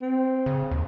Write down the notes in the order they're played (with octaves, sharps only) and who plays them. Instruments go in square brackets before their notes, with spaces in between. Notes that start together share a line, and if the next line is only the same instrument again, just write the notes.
[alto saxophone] C4
[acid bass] C#3
D#2